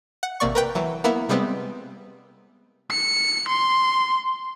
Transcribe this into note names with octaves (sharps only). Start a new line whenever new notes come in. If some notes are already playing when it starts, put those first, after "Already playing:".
F#5
A1 C3 A#3 D5 C#6
A#4 B4 G5
E3 F#3
A#3 B3 E4 C#7
C3 G3 G#3 B3 C4
C#7
C6